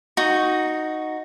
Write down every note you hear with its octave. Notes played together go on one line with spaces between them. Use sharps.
D#4 F#4